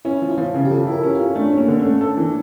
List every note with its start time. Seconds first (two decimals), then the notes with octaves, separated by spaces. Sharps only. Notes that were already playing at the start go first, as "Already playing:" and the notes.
0.05 C#4 E4
0.22 F3
0.31 E4
0.38 F3 F4
0.54 C#3
0.65 G4
0.71 F3 A4
0.87 E4 A#4
1.03 C#4
1.15 C#4 F4
1.35 A3 D4
1.53 C#4
1.58 A#3
1.68 D3
1.79 C#4
1.85 A3
2.01 A4
2.17 E3